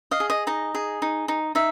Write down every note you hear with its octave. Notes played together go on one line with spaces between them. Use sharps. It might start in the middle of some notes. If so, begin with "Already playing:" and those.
D#5 F5
G#4
D#5
D#4 D#5
G#4
D#4
D#4
D#4 E5